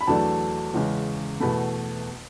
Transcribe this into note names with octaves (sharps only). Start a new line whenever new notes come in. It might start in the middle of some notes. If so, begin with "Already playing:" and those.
B5
E2 D3 F#3 A3 D4 A5
E2 C#3 G#3 C#4
E2 B2 A3 B5